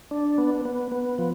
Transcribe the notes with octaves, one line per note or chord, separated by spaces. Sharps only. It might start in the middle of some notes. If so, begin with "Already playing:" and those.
D4
B3
B3
B3
F3